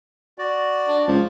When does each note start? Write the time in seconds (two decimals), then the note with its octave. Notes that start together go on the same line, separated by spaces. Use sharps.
0.38 F#4 D5
0.88 D4
1.08 C#2 F3